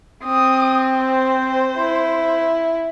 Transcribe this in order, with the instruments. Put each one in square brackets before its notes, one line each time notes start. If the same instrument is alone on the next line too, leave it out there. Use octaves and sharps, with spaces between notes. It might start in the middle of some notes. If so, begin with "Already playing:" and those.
[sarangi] C4 [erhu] D#6
[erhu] C5
[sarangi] E4